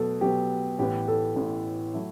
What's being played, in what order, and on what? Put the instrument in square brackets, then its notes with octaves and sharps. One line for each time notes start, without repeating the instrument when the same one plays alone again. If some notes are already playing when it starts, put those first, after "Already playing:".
Already playing: [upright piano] B2 F#3 B3 [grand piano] A4
[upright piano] B2 F#3 B3 [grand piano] G4
[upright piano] A1 A2 E3 B3 [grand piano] G4
[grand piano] A4
[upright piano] A1 A2 E3 B3
F#3 A3 E4